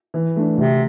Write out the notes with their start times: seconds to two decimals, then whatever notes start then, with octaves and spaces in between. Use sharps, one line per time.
0.14 E3
0.36 A3 D4
0.57 D2 C3